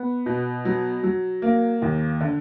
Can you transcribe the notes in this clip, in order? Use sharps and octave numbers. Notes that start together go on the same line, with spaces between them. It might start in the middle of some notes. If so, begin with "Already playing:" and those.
Already playing: B3
B2
F#3
F#3
A#3
D#2
D3